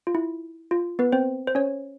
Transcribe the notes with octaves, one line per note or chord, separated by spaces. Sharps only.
F4
E4
F4
B3 B4
C4 C5
C5
C#4 C#5